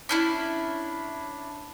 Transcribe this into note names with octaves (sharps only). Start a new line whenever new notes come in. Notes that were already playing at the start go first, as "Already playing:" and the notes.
C#4 D4 E4